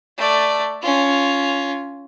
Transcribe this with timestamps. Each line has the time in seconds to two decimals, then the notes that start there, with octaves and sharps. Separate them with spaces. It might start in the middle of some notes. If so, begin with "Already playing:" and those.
0.18 A3 D5
0.82 C#4 F4